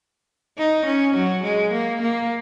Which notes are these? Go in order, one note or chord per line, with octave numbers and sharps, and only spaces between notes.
D#4
C#4
F#3
G#3
A#3
A#3